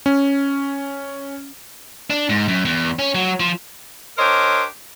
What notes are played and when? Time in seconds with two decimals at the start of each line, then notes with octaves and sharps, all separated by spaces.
0.06 C#4
2.10 D4
2.29 G#2
2.48 F#2
2.65 E2
2.99 C#4
3.15 F#3
3.40 F3
4.18 D4 G4 A#4 C5 C#5 D#5